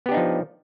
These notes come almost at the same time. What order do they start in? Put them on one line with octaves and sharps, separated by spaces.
B3 G4 D4 D#4 F3